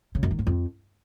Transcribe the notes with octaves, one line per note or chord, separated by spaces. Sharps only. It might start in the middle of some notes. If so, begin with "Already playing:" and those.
C#3
F#2
D#3
G#2
F2